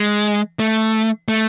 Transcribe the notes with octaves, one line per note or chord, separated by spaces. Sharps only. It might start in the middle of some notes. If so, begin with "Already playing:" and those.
Already playing: G#3
A3
A3